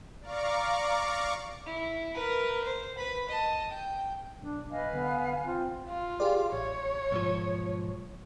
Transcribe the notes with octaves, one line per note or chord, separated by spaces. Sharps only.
D5 F5 A#5 C#6 D6
E4
A#4 B4
C5
B4 B5
D#5 A5
G5
B1 D4
B4 D#5 F5 G#5
D3 B3
C4 F4
F4
G4 G#4 D5
A1 C#5
B1 G#2 F3